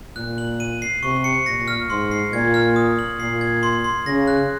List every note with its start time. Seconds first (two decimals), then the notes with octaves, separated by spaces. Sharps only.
0.16 A#2 F#6
0.38 F#7
0.60 D#7
0.82 C7
1.03 C3 C#6
1.24 C#7
1.46 A#2 A#6
1.68 F6
1.89 G#2 C6
2.11 C7
2.33 A#2 G#6
2.54 F6
2.76 D#6
2.99 F#7
3.20 A#2 C7
3.41 G#6
3.63 C6
3.84 C6
4.06 C#3 A#6
4.28 F#6